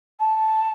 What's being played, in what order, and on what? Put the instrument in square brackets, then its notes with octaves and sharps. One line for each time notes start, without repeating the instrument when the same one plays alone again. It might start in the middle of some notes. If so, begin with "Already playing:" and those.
[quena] A5